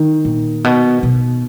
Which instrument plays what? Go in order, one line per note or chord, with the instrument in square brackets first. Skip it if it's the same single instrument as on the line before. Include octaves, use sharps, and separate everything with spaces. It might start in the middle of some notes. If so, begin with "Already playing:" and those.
Already playing: [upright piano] D#3
[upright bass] A#2
B2
B2